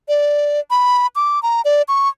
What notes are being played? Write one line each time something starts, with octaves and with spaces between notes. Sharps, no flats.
D5
B5
D6
A#5
D5
C#6